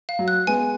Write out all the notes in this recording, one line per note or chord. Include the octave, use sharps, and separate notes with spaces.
F5
F#3
F#6
G#3 B3 G#5